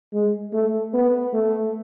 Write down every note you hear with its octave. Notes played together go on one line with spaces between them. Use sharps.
G#3
A3
B3
A3